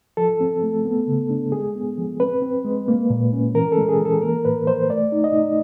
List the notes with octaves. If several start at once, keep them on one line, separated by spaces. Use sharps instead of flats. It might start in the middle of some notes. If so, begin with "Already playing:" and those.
F3 A4
C4
A3
B3
C#3
D4
G#3 G#4
B3
F3
C4 B4
C4
G#3
A#3
A#2
C#4
E3 A#4
A4
G#3
G#4
E3
A4
A#3 A#4
A2 B4
F3 C5
A3 D5
D#4
D#5
D#4